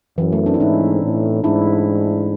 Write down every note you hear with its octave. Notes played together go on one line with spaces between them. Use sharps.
F#2 E3
A3
C4 D4
E4
G#2 C#4 D#4
A2
G#2 D4 E4